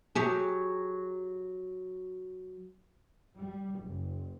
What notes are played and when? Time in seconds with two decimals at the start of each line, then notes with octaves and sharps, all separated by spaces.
0.15 F#3 G4 G#4
3.38 G3
3.82 F#1